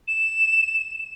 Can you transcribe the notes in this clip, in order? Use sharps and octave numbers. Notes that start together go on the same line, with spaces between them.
E7